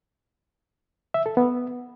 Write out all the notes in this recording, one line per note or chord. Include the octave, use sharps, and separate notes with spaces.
E5
A4
B3